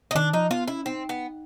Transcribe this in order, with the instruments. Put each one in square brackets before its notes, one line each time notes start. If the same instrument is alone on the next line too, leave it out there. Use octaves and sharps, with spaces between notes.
[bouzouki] D#4
[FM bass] D#3 [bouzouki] D4
[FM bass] F3 [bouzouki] D#4
[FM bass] B3 [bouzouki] F4
[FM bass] C#4 [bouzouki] E4
[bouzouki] C4 [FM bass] D#4
[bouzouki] B3